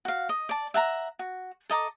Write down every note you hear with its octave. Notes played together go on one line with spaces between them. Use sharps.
F#4 F5
D#5
D5 A5
E5 F#5 A5 A#5
F#4
A4 D#5 A#5 D6